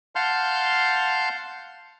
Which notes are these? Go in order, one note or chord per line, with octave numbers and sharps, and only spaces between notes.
F5 F#5 A5 C6 F6 G6